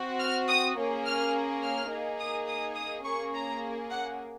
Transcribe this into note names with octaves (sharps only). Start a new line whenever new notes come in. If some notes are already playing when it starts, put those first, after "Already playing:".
Already playing: C4 F#4
F6
D#6
A#3 C#4 G#4
F6
F6
A#3 D#4 G#4
D#6
D#6
D#6
A#3 C#4 G#4 C#6
A#5
F#5